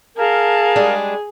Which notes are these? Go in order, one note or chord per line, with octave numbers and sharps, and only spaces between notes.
G#4 A#4 F5 A5
G3 G#3 D4